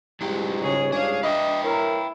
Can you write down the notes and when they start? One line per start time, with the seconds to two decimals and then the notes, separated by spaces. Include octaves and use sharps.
0.21 C#2 G#2 F#3 G3 E4 G4
0.63 C#3 G#4 C#5
0.92 D4 G#4 F5
1.23 D4 B4 D#5 E5 G5
1.64 E4 A#4 C#5